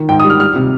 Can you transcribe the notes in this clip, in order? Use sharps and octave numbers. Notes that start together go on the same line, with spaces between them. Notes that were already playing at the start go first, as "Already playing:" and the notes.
Already playing: D#3
G#2 G5
D#6
G3
F6
G3 F6
C3